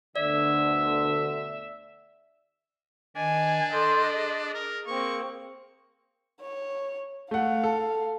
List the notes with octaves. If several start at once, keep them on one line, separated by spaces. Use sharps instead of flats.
D2 B2 D3 D5 E5
D#3 D4 D#5 G#5
A4 D#5 C6 G6
G#4
A#4
A#3 C4 C#6
C#5
A3 F5 F#5
A4